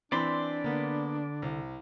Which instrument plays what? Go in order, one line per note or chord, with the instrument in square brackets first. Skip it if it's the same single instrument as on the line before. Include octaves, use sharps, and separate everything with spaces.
[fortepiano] E3 C4 [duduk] D4 [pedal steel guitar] D5 B5 C6
[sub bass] D3 [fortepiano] A#3 B3
[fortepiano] C2